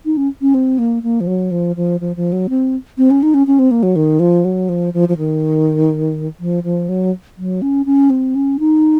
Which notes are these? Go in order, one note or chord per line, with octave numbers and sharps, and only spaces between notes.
D#4
C#4
C#4
C4
A#3
A#3
F3
F#3
F3
F3
F3
F3
F#3
C4
C4
C#4
D#4
C#4
C#4
C4
A#3
F#3
D#3
F3
F#3
F3
F3
F3
D#3
F3
F3
F#3
F#3
C#4
C#4
C4
C#4
D#4